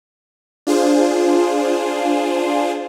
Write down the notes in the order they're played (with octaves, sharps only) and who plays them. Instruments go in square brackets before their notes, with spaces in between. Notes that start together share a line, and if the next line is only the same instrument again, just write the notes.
[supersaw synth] D4 F4 G#4 C5